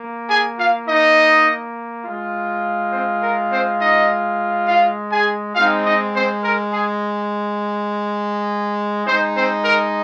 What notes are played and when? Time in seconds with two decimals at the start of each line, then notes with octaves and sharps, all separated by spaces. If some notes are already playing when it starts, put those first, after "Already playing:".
Already playing: A#3
0.29 G#4 G#5
0.58 F4 F5
0.87 D#4 D#5
2.05 G#3 F4
2.92 C4 C5
3.22 A#4
3.50 C4 C5
3.79 D#4 D#5
4.67 F4 F5
5.12 G#4 G#5
5.55 G#3 C4 D#4 F4 F5
5.85 D#4 D#5
6.14 C4 C5
6.43 A#4
6.73 G#4
9.06 G#3 C4 D#4 C5
9.35 C4 C5
9.64 A#4